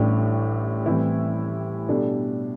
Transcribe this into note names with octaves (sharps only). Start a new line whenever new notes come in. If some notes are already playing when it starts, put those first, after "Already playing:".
Already playing: A1 A2 G3 D4 G4
A2 E3 G3 C4 E4
B2 G3 D4 A4